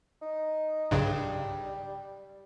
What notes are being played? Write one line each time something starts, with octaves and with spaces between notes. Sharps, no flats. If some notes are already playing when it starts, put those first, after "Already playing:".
D#4
B1 G2 C#3 G3